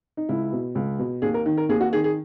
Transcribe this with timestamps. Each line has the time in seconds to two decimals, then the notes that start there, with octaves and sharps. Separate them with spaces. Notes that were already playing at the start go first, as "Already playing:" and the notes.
0.17 D#4
0.29 C#2 E4
0.52 B2
0.75 C#2
0.99 B2
1.22 D#2 G#4
1.34 A#4
1.46 D#3
1.58 A#4
1.69 D#2 G#4
1.81 F#4
1.93 D#3 G#4
2.04 G#4